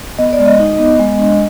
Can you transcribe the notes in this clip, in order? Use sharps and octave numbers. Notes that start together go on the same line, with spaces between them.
B3 D#5
D5
G#3
D#5
D#4
B3
G#3
D4